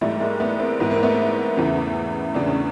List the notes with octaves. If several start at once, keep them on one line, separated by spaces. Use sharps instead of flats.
G#2 E3 G3 A3
G#3 A#3
A3 B3
A#3 C4
G#2 E3 B3
A#3
A3 B3
E2 C#3 E3
E2 C#3 E3 D4
C#4